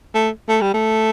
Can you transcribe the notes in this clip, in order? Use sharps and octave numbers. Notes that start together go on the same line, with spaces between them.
A3
A3
G3
A3